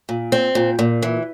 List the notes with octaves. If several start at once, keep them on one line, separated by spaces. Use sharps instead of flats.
A#2
C4
A#2
A#2
E3